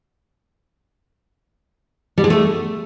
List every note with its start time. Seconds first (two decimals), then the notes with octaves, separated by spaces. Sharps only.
2.18 G3
2.24 G#3
2.30 A3